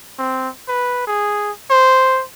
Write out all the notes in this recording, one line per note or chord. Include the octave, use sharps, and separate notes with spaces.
C4
B4
G#4
C5